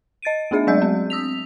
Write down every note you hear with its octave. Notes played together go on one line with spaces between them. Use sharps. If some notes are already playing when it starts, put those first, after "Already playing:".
D#5 A6 D7 D#7
A3 B3 D4 G#4 D#5 E5
F#3 G#3 D5 E6 G6
C4
D#6 E6 B6 F7